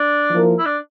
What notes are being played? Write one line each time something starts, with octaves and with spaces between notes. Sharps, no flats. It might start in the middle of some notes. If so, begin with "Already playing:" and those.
Already playing: D4
F3 A#3 E4 A#4
E4
D4